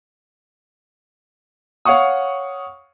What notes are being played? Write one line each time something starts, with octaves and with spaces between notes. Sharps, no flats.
C#5 F5 F#5 C#6 D#6